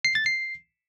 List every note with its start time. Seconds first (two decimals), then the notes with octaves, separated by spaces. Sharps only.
0.05 C7
0.15 A6
0.26 C7